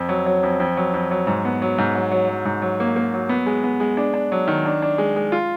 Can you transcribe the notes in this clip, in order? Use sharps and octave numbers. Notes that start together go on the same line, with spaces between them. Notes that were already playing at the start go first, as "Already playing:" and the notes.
Already playing: F2
F#3
F#3
F2
F2
F#3
F2
F#3
G#2
B3
F#3
G#2
F#3
F#3
F#3
G#2
F#3
A#3
A#3
F#3
B3
G#3
B3
G#3
D4
D4
F#3
D#3
D4
D4
G#3
G#3
F4